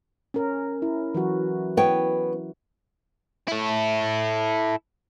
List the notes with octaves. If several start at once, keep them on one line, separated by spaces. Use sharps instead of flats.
C#4 A#4
E4
E3 F#3 F#4
B3 C#5 G5
E4 A4